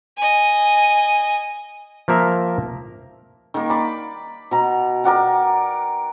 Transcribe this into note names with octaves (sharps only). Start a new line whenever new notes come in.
D#5 G#5
F3 A#3 A#4 E5
D#3 A#3
D5 B5 D6
B2 A#5
A#4 D5 F#5 G5